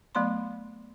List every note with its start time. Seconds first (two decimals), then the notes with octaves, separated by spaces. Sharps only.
0.15 F#3 A3 B3 D5 B5 C6